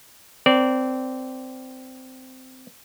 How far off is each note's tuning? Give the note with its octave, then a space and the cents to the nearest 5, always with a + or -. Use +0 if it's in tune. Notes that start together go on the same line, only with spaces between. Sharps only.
C4 -15 A#4 +15 D5 -20